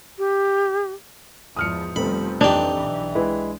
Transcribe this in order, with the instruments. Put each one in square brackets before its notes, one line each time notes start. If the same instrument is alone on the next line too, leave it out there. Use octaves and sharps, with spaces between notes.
[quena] G4
[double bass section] E2 G#2 F3 [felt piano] D#6 F6 C#7
[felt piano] F1 C4 [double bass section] B2 F3 G3 [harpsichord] B5
[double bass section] F2 E3 [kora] D4 [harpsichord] D#4 G4
[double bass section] B1 E3
[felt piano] G#3 E4 B4